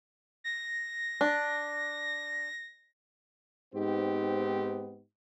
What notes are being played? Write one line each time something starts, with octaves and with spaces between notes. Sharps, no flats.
A#6
D4
G#2 B3 C4 D#4 G4